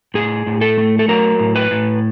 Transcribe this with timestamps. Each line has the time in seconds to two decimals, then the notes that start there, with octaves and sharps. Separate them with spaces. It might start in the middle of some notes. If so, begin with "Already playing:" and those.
0.14 A2 G#4
0.47 A2
0.61 A4
0.78 A3
0.99 A4
1.08 F#3 A#4
1.39 A2
1.56 B4
1.71 A2